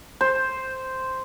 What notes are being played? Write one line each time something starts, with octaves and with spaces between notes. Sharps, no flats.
C5